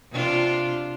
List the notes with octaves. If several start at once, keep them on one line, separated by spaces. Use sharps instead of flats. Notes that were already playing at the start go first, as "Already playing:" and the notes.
C3 D4 F4